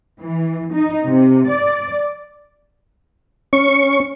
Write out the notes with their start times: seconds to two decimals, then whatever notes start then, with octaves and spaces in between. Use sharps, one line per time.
0.19 E3
0.74 D#4
1.06 C3
1.47 D5
3.53 C#4 C#6